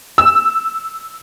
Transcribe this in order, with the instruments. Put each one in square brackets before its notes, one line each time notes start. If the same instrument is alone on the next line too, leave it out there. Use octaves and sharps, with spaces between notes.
[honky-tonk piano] E6